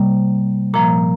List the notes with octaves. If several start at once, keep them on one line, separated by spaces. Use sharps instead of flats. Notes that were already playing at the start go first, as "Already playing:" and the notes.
Already playing: C3 G3 A#3
A#2 F3 A#3 A#5